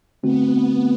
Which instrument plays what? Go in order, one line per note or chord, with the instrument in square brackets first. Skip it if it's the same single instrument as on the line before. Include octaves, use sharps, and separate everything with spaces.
[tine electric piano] D3 A3 C4 F#4 [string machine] B3
[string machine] B3